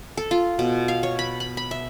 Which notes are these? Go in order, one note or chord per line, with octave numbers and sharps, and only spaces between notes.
A4
F4
B2
F5
C#5
B5
B5
B5
E5